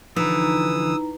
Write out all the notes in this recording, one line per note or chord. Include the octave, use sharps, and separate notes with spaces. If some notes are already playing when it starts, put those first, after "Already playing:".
D3 E3 F3 D#4 A#5 D#6 E6